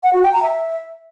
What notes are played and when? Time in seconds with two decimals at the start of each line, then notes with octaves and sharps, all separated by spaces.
0.03 F#5
0.13 F#4
0.23 G5
0.33 A#5
0.42 E5